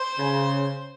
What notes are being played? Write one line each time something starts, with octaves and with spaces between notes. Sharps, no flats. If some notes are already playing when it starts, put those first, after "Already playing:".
Already playing: C5
C#3